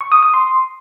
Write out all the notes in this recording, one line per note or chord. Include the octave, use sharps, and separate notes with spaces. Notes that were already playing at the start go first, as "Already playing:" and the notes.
C#6
D#6
D#6
C6